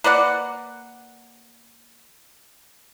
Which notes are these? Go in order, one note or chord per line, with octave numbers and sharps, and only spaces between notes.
A#3 B4 D5 F#5